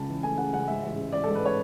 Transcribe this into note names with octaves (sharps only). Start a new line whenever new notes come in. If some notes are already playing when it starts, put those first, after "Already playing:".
Already playing: C#2 C#3 A5
E3
A3 G#5
C#3 F#5
C#2 F#5
G#2 E5
A1
G#3
A1 D5
A4
G#2
B4
C#5